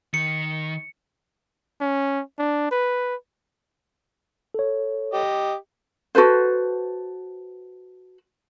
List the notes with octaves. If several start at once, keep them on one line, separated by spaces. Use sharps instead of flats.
D#3 C#7
C#4
D4
B4
A4 C#5
G4 D#5
F#4 A4 B4 C5